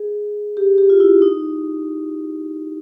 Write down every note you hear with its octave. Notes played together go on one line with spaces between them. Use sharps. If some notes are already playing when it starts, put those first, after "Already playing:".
Already playing: G#4
G4
G4
F4
E4
D#4